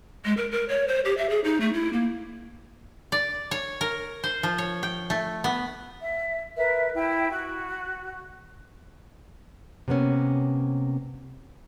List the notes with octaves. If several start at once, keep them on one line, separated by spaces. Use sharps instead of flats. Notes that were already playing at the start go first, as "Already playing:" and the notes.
G#3
A#4
A#4
C#5
C5
G4
E5
G#4
D#4
A3
E4
A#3
D5
C#5
A#4
C5
F3
C#5
G5
A3
B3
E5
A#4 B4 E5
E4 G5
F#4
C3 A#3 B3 C#4